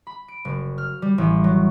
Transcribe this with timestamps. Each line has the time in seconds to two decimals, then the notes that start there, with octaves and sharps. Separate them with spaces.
0.07 B5
0.28 D7
0.45 F#1
0.78 F6
1.02 G3
1.18 A1
1.44 F#3